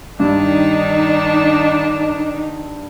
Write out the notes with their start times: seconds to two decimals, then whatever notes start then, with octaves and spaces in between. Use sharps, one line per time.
0.20 G2 D#3 D4 D#4